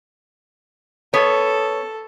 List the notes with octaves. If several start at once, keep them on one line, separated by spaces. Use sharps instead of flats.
B3 A4 C#5